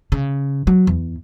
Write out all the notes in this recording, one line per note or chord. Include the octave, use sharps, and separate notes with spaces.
C#3
F#3
E2